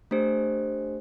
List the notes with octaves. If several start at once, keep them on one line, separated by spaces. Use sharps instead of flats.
A3 D4 G4 C5